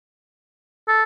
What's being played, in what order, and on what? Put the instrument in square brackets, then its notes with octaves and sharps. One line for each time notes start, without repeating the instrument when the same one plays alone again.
[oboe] A4